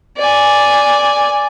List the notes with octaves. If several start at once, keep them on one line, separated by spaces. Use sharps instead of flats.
D5 G#5